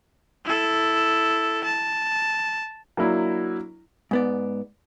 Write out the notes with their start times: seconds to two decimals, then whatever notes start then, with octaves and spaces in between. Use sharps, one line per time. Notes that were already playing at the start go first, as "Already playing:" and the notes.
0.45 E4 A4
1.64 A5
2.97 F#3 A#3 D4 E4
4.11 G#2 B3 D5